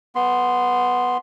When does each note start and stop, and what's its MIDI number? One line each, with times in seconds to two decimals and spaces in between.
0.15 1.18 59
0.15 1.18 84